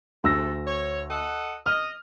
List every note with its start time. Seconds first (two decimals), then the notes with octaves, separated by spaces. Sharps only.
0.24 D2 G#2 C3 A4 E6 A#6
0.66 C#5
1.10 A4 D#5 F#5
1.66 D#5 F6